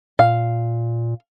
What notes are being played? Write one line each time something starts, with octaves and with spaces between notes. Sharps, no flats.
A#2 F5